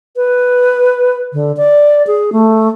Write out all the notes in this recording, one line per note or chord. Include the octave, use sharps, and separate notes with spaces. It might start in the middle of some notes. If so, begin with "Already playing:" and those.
B4
D3
D5
G#4
A3